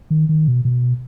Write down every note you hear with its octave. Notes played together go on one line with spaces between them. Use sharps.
D#3
D#3
B2
B2